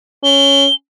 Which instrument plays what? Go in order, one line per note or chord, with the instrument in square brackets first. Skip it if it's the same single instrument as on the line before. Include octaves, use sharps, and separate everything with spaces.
[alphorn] C#4 [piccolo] G7